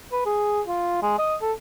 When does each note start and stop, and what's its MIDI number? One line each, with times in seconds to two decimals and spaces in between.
0.12 0.21 71
0.26 0.61 68
0.67 1.01 65
1.02 1.16 56
1.18 1.35 75
1.41 1.52 69